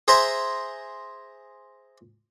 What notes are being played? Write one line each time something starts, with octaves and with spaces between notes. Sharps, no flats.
G#4 C5 E5 A#5 C6